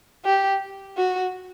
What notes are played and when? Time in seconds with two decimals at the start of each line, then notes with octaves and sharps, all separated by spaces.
0.25 G4
0.97 F#4